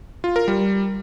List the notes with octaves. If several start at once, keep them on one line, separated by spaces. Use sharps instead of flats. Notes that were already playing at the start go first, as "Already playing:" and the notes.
F4
A#4
G3